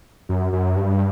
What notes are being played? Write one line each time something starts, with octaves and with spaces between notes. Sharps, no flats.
F#2
F#2
G2